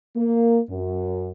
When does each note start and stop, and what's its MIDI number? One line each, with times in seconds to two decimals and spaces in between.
0.16 0.60 58
0.70 1.29 42